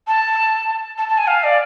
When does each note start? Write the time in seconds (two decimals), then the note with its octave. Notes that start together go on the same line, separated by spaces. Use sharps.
0.07 A5
0.98 A5
1.08 A5
1.18 G#5
1.27 F5
1.44 D5